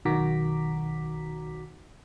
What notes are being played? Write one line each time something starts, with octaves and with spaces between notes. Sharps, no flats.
B1 D#3 F#4 A#5 D6 B6